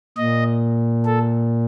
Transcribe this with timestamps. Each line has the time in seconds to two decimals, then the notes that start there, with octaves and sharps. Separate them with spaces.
0.17 A#2 D#5
1.06 A4